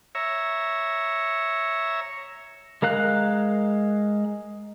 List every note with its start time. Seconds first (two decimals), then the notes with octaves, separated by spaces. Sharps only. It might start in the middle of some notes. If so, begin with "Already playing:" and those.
0.15 C#5 E5 A#5
2.82 G#3 A#4 F5 F#6